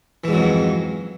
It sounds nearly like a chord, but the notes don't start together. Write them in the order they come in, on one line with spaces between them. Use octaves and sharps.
E3 G#2 F#3 F2